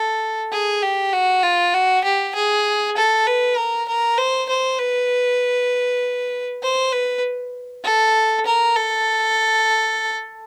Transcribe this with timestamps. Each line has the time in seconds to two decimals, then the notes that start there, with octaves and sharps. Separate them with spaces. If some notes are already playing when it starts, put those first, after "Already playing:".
Already playing: A4
0.52 G#4
0.82 G4
1.13 F#4
1.43 F4
1.74 F#4
2.04 G4
2.35 G#4
2.97 A4
3.27 B4
3.57 A#4
3.88 A#4
4.18 C5
4.49 C5
4.79 B4
6.63 C5
6.93 B4
7.84 A4
8.46 A#4
8.76 A4